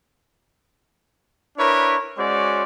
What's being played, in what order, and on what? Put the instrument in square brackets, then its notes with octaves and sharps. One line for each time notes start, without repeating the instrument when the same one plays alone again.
[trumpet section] D4 E4 A#4 B4 C#5
G#3 C#4 F#4 C5 D5